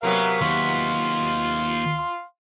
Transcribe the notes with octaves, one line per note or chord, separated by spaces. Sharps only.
C3 F#3 B3 A#4 F5
D#2 F5 C6